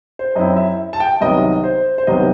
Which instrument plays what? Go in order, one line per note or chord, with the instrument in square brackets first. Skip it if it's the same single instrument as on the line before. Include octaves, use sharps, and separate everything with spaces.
[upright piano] C5
F#2 F#3 C4 E4 D#5
E5
A5
G5
C2 C3 D#3 F#3 B3 D#5
C5
C5
C2 C3 D#3 F#3 B3 D#5